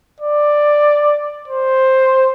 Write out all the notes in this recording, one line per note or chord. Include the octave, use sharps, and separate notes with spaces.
D5
C5